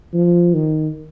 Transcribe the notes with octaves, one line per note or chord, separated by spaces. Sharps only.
F3
D#3